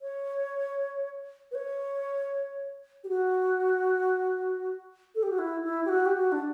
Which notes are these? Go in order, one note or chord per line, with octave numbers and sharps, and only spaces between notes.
C#5
B4
C#5
G4
F#4
A4
G4
F#4
E4
E4
G4
F#4
G4
F#4
D4